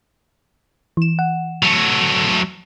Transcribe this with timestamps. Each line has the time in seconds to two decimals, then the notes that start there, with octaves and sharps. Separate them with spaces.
0.97 E3 E7
1.19 F#5
1.63 F#3 A3